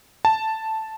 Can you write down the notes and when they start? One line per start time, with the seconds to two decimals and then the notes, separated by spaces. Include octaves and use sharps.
0.25 A5